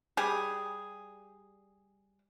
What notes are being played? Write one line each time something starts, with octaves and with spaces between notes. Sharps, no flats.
G3 G4 G#4